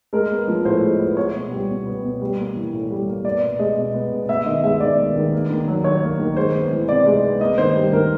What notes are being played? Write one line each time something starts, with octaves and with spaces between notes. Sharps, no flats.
G#3 A#4
B3
F3
A2 C5
G#3
B3
B3 C#5
B2
G3
B2
B3
B2
G3
A#3
E3
A2
G3
A#3
B3 D5
B2
G#3 D#5
B2
B3
B2
B3 E5
D#3 D#5
G#3 E5
D#3 D5
B3
D#3
A#3
D#3
F#3
D#3 C#5
A#3
D#3
G#3 C5
B3
E3
C3 D5
G#3
B3
A#3 D#5
D#3 C5
G3
D#3 A#4